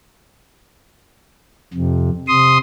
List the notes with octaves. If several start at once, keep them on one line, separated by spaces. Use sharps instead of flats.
F2 C3
C3 C6 D#6